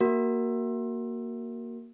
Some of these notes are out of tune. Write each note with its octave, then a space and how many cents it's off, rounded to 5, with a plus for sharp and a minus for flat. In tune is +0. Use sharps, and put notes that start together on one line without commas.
A#3 +0 F#4 +15 A#4 +0